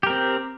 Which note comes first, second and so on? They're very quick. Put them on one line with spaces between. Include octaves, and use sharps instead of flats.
G4 A#4 C4